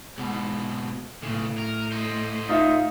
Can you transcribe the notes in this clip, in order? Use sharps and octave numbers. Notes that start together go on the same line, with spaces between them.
G#2 B2
B1 A2 C#3
A#4
C5 D#5
D#4 F4 E5